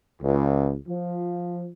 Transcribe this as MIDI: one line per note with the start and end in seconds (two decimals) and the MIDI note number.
0.21 0.74 37
0.89 1.67 53